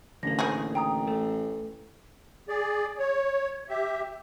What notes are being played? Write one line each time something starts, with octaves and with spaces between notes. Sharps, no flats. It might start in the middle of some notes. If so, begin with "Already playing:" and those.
A1 D3 A#3 A#6
D#3 F3 G#4
G5 A#5 D#6
A3
G#4 D5
C#5
G4 E5